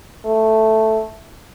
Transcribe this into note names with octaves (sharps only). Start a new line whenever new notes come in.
A3